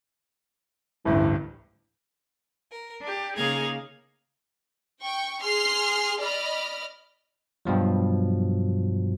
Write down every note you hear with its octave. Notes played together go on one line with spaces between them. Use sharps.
A1 D2 G2 E3
A#4
D4 G4
C#3 A#3 D#4 G#4 F5 G#6
G5 C#6
G#4 C6 F6 C7
D5 D#5 B5 F6
G2 B2 F3 F#3